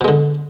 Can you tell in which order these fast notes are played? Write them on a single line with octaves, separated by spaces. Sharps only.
B2 G#3 D3